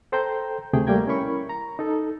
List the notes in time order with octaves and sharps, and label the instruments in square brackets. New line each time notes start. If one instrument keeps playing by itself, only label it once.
[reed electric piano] A4 C5 G5 A#5 G6
D2 C3 A3 G#4 G5
G3 A3 A#3 G5 A#5 G#6
C#4 E4 A#4 B5 C#6
A#5
D#4 A4